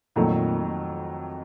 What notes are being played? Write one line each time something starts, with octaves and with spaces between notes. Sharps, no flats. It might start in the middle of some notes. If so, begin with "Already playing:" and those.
F2 A#2 D#3 F#3 A3